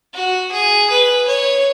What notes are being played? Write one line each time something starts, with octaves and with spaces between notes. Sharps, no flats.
F#4
G#4
B4
C#5